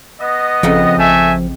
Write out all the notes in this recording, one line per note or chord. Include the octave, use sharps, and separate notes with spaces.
B3 D#5
G#1 F2 C#3 F3 D#4
A1 A3 E5 G#5